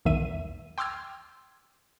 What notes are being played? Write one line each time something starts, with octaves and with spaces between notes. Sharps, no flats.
B1 E2 D#3 E5 D#7
G5 C6 D6 E6 F6 G#6